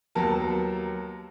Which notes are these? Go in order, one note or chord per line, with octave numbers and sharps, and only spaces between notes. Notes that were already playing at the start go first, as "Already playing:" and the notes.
D#2 F#3 B3 A#4 A5